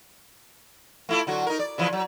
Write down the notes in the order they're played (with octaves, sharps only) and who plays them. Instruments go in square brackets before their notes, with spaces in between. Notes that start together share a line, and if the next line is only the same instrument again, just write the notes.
[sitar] A3 E4 F4
D3 F#3 F#4
D#4 A#4
D5
C#3 E3 F3
F#3